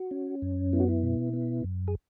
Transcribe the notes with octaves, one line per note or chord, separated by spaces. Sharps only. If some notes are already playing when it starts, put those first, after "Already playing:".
Already playing: F#4
C#4
F#2
B3 E4
F#4
E4
B2
B3
F#2
G#4